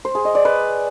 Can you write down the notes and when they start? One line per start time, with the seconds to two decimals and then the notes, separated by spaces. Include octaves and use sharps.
0.05 C5
0.15 G#4
0.25 D#5
0.35 D5
0.45 B4